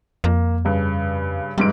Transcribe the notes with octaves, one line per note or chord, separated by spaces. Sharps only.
F2 A#3
G2 C#3
F1 G#2 G3 D7